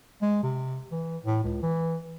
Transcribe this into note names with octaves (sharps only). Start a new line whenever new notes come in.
G#3
C3
E3
A2
C#2
E3